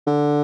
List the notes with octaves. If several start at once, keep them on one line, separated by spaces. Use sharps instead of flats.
D3